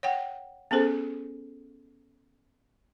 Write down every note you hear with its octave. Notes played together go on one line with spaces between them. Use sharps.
C#5 F#5 G5
B3 C#4 G#4 A4 C5